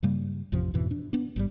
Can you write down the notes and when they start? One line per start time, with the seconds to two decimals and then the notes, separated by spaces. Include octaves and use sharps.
0.03 G2 C#3 G3 A#3
0.52 A1 F2 C3 F3
0.74 F2 G#2 B2 E3
0.91 D4
1.13 B3 D4
1.36 G#1 G2 G3